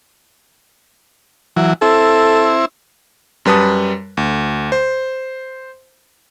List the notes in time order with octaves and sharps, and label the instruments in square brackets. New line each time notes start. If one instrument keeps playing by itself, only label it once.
[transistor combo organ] E3 F#3
[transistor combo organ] C4 E4 [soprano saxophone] A4
[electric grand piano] F#2 G3 B4 A5 D#6
D2
C5